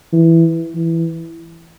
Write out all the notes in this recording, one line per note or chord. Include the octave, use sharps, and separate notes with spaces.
E3
E3